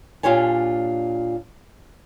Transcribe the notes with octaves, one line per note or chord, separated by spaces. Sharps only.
A#2 D4 F4 G4 C#5 G#5